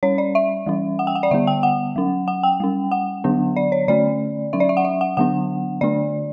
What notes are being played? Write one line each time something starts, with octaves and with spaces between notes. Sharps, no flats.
G3 C#4 C#5
D5
E5
E3 G3 C#4
F#5
G5
F#5
D5
D3 G3 B3 E5
G5
F#5
F#3 C#4
F#5
G5
G3 C#4
F#5
D3 F#3 B3 D4
D5
C#5
D3 A3 C#4 D5
F#3 C#4 E5
D5
E5
F#5
E5
F#5
D3 F#3 B3 D4 F#5
D3 A3 D4 D5